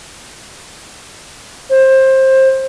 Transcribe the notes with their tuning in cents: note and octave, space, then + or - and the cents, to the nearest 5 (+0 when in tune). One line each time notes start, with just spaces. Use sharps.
C5 +20